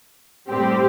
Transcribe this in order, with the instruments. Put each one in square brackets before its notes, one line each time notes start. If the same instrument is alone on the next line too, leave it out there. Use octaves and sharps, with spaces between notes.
[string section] A2 G3 C4 G4